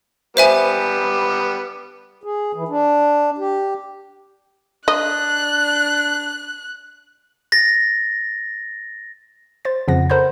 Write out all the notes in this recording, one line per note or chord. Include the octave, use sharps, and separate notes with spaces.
G3 B3 C5 E5 G#5
G#4
E3
D4
G4
D4 D#5 F#6
A6 A#6
C5 A6
F2 C#3 F3 F#5 A#6
A4 A#4 C5 F#5 B5 G6